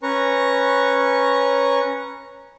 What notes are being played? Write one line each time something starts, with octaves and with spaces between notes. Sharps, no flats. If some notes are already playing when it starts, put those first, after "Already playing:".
C#4 B4 A#5 C#6